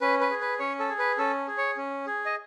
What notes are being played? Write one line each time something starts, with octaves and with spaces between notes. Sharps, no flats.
C#4 B4
B4
G#4
B4
C#4 C#5
A4
G#4
B4
C#4 A4
G#4
C#5
C#4
G#4
D#5